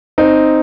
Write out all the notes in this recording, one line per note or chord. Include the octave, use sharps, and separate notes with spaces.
C4 D#4